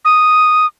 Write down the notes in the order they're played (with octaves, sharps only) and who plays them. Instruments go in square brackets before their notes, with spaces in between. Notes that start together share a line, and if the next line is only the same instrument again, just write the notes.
[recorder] D#6